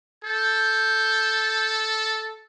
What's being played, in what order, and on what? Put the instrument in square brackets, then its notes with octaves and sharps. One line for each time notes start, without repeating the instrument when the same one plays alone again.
[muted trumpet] A4 [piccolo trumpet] G6